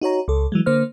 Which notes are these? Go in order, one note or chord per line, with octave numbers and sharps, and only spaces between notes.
D#4 F#4 C#5 A#5
C#2 A4
E3 F#3 G#3
D3 A#3 C5 F6